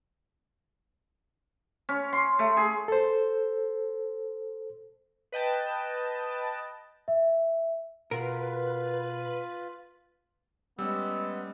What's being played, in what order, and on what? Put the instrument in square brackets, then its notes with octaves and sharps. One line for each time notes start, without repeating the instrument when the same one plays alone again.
[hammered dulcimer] C#4
C6
A3
G#4
[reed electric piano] A4 C5
[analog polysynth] B4 D#5 G5 A5
[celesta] E5
[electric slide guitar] B2 F#4 G#4 [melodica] F4 [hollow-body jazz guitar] A#4 [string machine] B4
[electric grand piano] G3 C#4 [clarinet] G#3 [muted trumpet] B3 [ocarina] E6